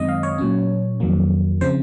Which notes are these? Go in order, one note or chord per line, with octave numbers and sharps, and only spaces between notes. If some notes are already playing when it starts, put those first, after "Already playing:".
Already playing: F#2 D#3 G#3 C4 D#5
F5
C#5
A#2 F#3 C#4
F2 D#3 F#3 A#3
C#3 F3 C4 C5